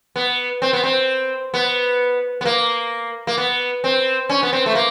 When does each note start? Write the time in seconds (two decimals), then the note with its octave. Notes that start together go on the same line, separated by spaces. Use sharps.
0.16 B3
0.62 C4
0.73 B3
0.84 C4
1.54 B3
2.41 B3
2.45 A#3
3.27 A#3
3.38 B3
3.84 C4
4.29 C#4
4.43 B3
4.53 C4
4.66 A3
4.75 A#3